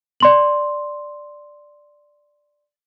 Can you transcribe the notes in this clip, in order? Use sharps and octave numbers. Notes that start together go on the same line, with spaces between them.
D5 C6 F#7